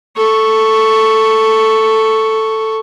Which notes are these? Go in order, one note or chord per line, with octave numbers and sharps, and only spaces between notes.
A4 C#6